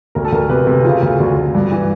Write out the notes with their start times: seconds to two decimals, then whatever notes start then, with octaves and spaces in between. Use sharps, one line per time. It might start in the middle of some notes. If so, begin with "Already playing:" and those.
0.15 D2 A#4
0.25 A4
0.32 D2 A#4
0.49 C3 B4
0.67 C3
0.84 C#3 F4
1.03 D2
1.20 D2
1.36 D2
1.55 G2
1.71 E3